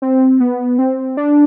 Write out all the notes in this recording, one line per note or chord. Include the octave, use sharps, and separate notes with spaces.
C4
B3
C4
D4